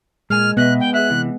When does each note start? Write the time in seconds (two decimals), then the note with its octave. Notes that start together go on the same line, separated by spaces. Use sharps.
0.30 A#2 G#3 G#5 F6
0.57 B2 B3 D#5 E5 F#6
0.80 G5
0.94 G#4 E5 F#6
1.10 C3 E3